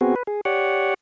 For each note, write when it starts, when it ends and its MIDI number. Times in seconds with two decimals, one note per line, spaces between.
0.01 0.15 59
0.01 0.15 60
0.01 0.15 66
0.01 0.15 68
0.16 0.23 71
0.27 0.41 68
0.45 0.94 67
0.45 0.94 73
0.45 0.94 74
0.45 0.94 78